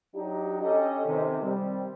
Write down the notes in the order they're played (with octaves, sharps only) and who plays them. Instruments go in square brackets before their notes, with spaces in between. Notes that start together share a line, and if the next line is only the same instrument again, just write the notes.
[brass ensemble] F#3 D4 D#4 G4
C#4 G4 A4 D#5
C3 D#3
G3 C4